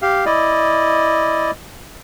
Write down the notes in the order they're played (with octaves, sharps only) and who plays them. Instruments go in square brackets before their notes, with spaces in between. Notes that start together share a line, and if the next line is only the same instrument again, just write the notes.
[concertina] G4 F5
E4 D5 D#5